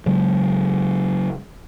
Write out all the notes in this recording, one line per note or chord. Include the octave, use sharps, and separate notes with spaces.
C#3 F#3 G#3